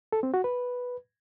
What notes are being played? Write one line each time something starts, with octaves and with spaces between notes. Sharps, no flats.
A4
C4
F#4
B4